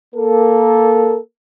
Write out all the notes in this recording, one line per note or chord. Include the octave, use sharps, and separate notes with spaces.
A#3 A4 A#4